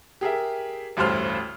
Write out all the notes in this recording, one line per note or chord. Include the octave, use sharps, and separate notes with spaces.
G4 G#4 A#4 E5
A1 D2 G2 C5 C6 F6